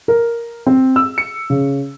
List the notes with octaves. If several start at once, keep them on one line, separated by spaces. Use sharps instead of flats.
A#4
C4
E6
C#7
C#3